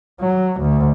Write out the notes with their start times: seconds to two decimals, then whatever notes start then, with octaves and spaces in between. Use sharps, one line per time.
0.21 F#3
0.61 D2